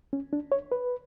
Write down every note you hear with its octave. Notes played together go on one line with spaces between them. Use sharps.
C#4
D4
C#5
B4